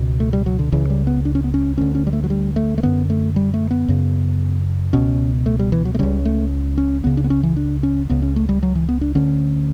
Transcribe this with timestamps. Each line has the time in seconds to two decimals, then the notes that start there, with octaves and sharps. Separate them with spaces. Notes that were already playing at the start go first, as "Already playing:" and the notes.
Already playing: C#2 B2
0.20 A3
0.33 G3
0.46 F#3
0.59 D3
0.72 C#2 C#3 E3
0.90 G3
1.07 B3
1.25 D4
1.35 C#4
1.44 B3
1.54 C#4
1.78 D2 D3 C#4
1.95 C#4
2.07 G3
2.13 A3
2.24 F#3
2.30 G3
2.56 A3
2.78 A3
2.83 F#2 D3 B3
3.10 A3
3.36 G3
3.54 A3
3.71 B3
3.88 F#2 C#3
4.93 C#2 B2 C#4
5.46 A3
5.59 G3
5.72 E3
5.85 F#3
5.94 A3
5.99 C#2 C#3 G3
6.25 A3
6.78 C#4
7.04 C#2 C#3 B3
7.17 D4
7.24 B3
7.30 C#4
7.43 E3
7.56 D4
7.83 C#4
8.10 C#2 C#3 B3
8.22 C#4
8.36 A3
8.49 G3
8.63 F#3
8.75 E3
8.89 B3
9.01 D4
9.15 D2 D3 C#4